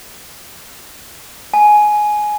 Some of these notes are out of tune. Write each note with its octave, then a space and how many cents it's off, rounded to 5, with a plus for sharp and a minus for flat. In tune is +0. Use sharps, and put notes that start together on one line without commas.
G#5 +15